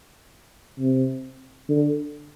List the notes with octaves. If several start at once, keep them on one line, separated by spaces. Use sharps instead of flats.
C3
D3